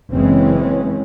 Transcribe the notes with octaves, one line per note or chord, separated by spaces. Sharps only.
F#1 E3 G#3 C4 C#4